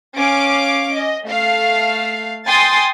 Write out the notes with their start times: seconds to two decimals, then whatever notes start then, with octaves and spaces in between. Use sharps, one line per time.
0.17 C#4 F5 D6 D7
0.94 D#5
1.24 A3 F5
2.46 G5 G#5 C6 D#6 A6